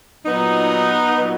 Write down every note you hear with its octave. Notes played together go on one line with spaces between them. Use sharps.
A#2 F#3 B3 D#4
A#2 F#3